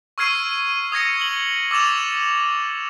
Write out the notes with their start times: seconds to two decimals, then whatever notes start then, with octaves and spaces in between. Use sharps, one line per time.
0.18 C#6 E6 F6 G#6 C7 D#7
0.92 D#6 G#6 A#6 C#7
1.20 F#7 G7
1.71 D6 E6 A6 E7 F7